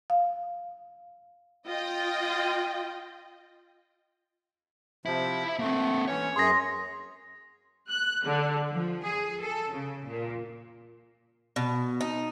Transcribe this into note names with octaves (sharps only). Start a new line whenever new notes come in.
F5
F4 D#5 G5
C3 F3 E4 E5
A3 A#3 C4
E3 C#4 C#5
F#2 G#4 C6 A#6
F#6
D3
F3
G#4
A4
C#3
A#2
B2
D#4